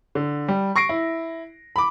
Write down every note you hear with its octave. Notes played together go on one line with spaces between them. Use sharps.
D3
G3
C#6 A#6 C7 D7
E4
B5 D6